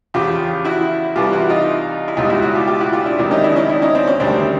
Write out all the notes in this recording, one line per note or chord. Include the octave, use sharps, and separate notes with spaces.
E2 C#3 F3 F4 G4
E4 F#4
C2 C3 E3 G3 F4 G4
E4 F#4
D#4 F4
E4
C#2 B2 G3 D#4 F4
E4 F#4
E4 F#4
F4 G4
F4 G4
E4 F#4
F4 G4
D4 E4
C#2 C3 D#3 F#3
D4
C#4 D#4
D4 E4
C#4 D#4
D4 E4
C#4 D#4
C4 D4
C#4
D2 C3 D#3 G3 C4 D4